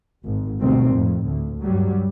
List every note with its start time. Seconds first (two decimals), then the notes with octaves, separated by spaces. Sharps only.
0.25 G#1
0.61 D2 B2 D#3 G3 C4
0.92 F2 A2
1.24 D2
1.62 G2 F#3 G3